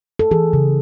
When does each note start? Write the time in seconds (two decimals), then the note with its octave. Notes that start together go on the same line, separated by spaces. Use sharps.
0.19 A4
0.31 E3 G#4
0.53 C#3